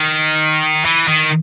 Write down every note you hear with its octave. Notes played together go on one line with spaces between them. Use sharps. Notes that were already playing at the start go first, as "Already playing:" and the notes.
Already playing: D#3
E3
D#3